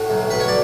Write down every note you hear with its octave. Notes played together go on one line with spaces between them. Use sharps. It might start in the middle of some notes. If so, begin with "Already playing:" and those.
Already playing: A2 F#4
B1
B2 B4
C#5
D5